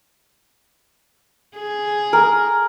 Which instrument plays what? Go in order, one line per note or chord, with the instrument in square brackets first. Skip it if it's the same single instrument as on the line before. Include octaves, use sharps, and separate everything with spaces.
[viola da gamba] G#4
[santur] A#4